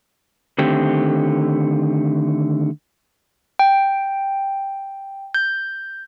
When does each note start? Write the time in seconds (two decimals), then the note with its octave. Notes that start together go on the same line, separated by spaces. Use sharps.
0.58 D3 D#3 A3 C4 G4
3.59 G5
5.34 G6